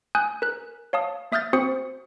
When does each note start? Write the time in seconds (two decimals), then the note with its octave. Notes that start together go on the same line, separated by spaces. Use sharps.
0.15 G#5 D#6 F#6 G6
0.42 A#4 F#6
0.93 C#5 F5 A5 D#6
1.32 A#3 E5 D#6 F6 G6 A6
1.53 C4 F#4 C5 D#6 C#7